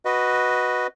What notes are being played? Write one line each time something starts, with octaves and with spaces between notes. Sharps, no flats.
F#4 B4 D#5